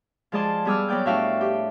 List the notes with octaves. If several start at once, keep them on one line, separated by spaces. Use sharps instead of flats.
F3 G#3 G#4 D5 A5 C6
G3 B3 G#4 D6 E6 F6
F#3 B3 D5 G5 G6
A2 D4 F#4 E5 F5 G5
G4